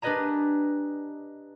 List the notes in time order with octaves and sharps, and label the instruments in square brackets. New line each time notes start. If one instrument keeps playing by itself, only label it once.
[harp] D4 G4 B4 D#5 G#5 A#5